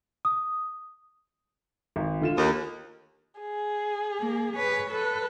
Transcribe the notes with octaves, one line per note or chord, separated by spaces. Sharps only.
D#6
G#1
D3 F4 E7
D#2
G#4
A#3
B4 C#5
A4 B4